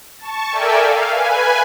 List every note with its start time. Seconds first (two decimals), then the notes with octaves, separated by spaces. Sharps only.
0.19 A5 C#6
0.50 A4 A#4 D5 E5 G5 G#5
0.79 F5
1.11 B4 G#5